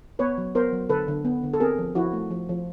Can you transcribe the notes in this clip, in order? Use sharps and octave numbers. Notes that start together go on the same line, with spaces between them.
B3 B4 C#5
F#3
B3 A#4 C5
F#3
D3 A4 B4
D3
B3
D3
A4
C4 G#4 A#4
F3
F3 E4 F#4
A3
F3
F3